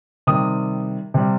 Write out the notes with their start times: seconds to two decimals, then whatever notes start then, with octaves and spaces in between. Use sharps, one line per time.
0.27 C3 D#3 G3 D#6
1.14 C3 G3